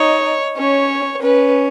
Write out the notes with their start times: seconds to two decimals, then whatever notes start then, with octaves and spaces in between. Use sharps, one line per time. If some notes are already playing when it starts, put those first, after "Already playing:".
Already playing: D#4 C#5
0.58 C#4 C#5
1.22 C#4 B4